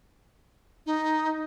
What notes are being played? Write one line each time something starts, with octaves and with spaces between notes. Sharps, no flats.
D#4